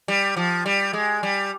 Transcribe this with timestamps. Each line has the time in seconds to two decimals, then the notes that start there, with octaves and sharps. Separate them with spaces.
0.08 G3
0.37 F3
0.66 G3
0.93 G#3
1.23 G3